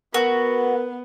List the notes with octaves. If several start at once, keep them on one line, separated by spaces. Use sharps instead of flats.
B3 F#4 A#4 B4